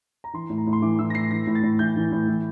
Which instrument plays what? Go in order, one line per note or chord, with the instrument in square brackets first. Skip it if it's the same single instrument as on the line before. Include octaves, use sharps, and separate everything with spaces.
[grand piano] A#5
E3 C6
A2
A#5
A2
C6
E3 D6
E3 E6
A#6
A2 C7
E3 A#6
A2
A6
A2
E3 G6
E3
A2
E3